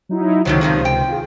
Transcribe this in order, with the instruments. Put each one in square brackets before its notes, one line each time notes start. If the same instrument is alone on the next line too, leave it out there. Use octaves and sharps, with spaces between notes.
[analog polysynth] F#3 D#4 E4
[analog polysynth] C#2 C3 C5 [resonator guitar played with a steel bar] A2 D#3 F#3
[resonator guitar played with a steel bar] A#2 D#3 F3
G5
[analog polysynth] F4 G#4